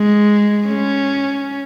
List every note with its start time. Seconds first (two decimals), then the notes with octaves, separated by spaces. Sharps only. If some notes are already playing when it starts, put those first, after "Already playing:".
Already playing: G#3
0.67 C#4